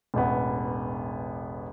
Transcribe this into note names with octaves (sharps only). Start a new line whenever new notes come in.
E1 A1 B3